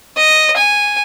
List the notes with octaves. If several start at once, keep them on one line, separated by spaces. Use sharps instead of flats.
D#5
G#5